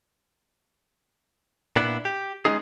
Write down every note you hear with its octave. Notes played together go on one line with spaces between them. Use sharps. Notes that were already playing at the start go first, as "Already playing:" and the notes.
A#2 B3 D4 E4
G4
G#3 A3 B3 C#4 D#4 G#4